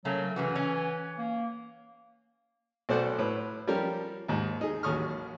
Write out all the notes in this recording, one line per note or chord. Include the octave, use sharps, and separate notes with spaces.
C#3 F#3 A3 A#3
F#2 C#3 E3 F#4
C#4
A#3
B1 A3 C5 D5 F#5
A2 B4 C5
F3 G3 C#4 G4 A#4
D#2 G#2
D#4 G#4
A1 D#2 F#3 C#6 D#6 F6